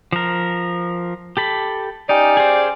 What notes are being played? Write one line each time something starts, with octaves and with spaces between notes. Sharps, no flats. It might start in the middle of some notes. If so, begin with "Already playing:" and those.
F3 A#4
G4 A4 B5
C#4 D#4 G4 D5
G#4 C5